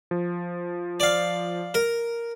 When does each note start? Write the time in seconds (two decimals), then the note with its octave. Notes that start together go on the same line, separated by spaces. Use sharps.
0.11 F3
1.00 D5 F5
1.74 A#4